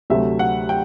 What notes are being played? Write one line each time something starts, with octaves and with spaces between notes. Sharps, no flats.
D2 C3 F#3 A3 E5
F#5
G5